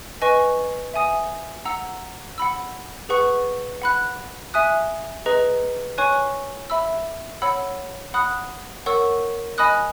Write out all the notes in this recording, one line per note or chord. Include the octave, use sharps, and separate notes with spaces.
B4 D#5 G#5 C#6
E5 G#5 D#6
F#5 A#5 E6
F#5 B5 E6
G#4 B4 F#5 C#6
F#5 B5 F#6
E5 G#5 D#6 F#6
G#4 B4 D#5 A#5
C#5 G#5 C#6 F#6
E5 B5 E6
C#5 F#5 B5 E6
F#5 B5 D#6 F#6
A#4 C#5 F#5 C#6 E6
D#5 G#5 B5 D#6 F#6